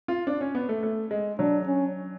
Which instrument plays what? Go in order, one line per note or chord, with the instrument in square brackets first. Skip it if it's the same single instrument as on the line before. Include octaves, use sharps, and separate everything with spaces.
[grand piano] F4
D4
C#4
B3
A3
A3
G#3
[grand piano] F#3 [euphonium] D4
[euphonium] C#4